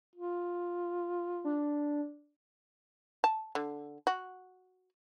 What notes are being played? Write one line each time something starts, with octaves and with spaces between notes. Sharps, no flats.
F4
D4
A5
D3
F#4